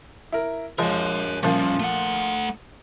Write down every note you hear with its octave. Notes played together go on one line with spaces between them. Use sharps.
E4 A#4
F3 G#3 A#4 C#5
A#2 F3 G3 A#3 C#4
A3 F#5